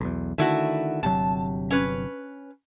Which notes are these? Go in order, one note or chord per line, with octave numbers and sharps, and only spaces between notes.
B1 E2
D3 D#3 A3 E4 F#4
G1 C3 F#3 A5
C#4 B4